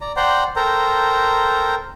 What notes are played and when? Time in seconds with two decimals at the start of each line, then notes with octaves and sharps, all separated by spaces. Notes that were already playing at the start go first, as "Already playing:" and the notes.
0.01 D5 A#5
0.16 C5 D5 F#5 G5 A#5 C6
0.56 A4 A#4 C5 G5 A#5